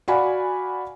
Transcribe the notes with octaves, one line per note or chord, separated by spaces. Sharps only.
F#4 D5 F5 F#5 G#5 B5